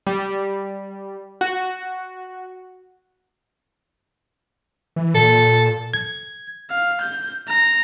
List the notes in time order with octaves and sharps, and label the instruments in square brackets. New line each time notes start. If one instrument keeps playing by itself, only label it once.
[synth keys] G3
F#4
[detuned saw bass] E3
[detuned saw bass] A#2 [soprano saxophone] A4
[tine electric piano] G#6
[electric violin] F5
G6
A#5